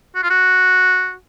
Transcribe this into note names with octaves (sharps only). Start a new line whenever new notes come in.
F#4
F4
F#4